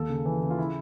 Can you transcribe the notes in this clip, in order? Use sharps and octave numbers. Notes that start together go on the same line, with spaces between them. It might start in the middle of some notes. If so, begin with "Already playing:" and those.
Already playing: D#2 A4
C#3
E3
C#3
F4
E4